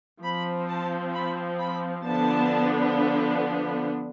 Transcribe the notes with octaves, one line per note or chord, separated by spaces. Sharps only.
F3 C4 B5
A5
B5
B5
D3 F3 B3 D4 A5